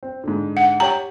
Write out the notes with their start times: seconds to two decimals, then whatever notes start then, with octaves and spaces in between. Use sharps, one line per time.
0.03 C4
0.24 G#2 D3
0.57 F#5
0.80 G4 C#5 A#5